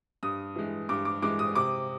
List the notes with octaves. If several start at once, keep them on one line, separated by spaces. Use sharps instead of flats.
G2 D#6
E3 G#3
G2 D6
D6
E3 G#3 D6
D#6
C3 D6